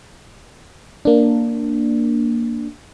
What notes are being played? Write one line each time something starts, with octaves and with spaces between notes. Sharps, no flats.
A#3 D4